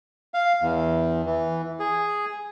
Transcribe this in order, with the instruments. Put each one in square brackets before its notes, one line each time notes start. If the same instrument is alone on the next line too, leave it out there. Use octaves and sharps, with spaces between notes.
[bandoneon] F5
E2
E3
G#4